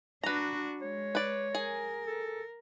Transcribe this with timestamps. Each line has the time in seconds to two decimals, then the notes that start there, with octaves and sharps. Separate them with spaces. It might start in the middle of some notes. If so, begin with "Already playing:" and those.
0.24 D4 F#4 B4 A#5
0.82 G#3 C#5
1.15 B4 D5
1.55 G#4 A#4
2.07 A4